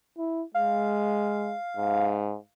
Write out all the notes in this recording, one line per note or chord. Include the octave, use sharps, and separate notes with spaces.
E4
G#3 F5
G#2